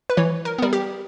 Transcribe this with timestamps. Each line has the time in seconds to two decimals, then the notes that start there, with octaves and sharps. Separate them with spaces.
0.10 B4
0.17 E3 C#5
0.45 A#4
0.59 G3 B3 A#4
0.73 G4